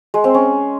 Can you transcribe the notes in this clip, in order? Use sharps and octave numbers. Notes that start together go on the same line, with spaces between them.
G#3
C4
C#4